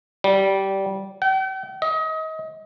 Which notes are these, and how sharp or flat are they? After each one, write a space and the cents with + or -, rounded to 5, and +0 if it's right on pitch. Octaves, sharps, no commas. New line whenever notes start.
G3 -15
G5 -45
D#5 +30